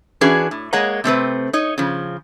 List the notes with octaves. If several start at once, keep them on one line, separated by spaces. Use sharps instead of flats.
E3 C#4 D4 F#4 G#4 B4
A2
G#3 A#3 C#5 D#5 F#5 A#5
C3 A3 C4 B4
D#4 C#5 D#5
C#3 F3